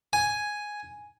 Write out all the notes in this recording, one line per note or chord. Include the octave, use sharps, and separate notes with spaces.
G#5